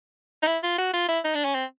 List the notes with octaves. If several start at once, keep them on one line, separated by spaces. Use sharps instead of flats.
D#4
E4
F4
F#4
F4
E4
D#4
D4
C#4
C4